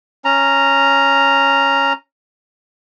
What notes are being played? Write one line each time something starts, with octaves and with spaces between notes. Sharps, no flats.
C#4 A#5